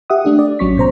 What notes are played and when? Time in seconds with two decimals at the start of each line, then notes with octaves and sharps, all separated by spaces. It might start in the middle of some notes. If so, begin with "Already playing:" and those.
0.10 G4 E5 F#5 D#6
0.25 A3 D4 G4
0.39 D5
0.59 A1 F#3 C#4 C#6 B6
0.76 G#2 B2 C5 A#5